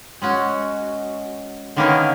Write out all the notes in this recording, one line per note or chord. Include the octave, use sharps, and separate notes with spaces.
G#3 C#4 F#4
D3 D#3 A#3 B3 C#4 D#4